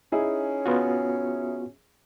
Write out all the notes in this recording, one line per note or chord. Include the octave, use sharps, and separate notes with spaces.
C#4 D#4 E4 G#4
B3 F4 F#4